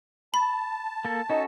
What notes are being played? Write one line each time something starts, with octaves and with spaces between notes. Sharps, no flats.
A5 B5
A#3 A4
C#4 D#4 F#4 A4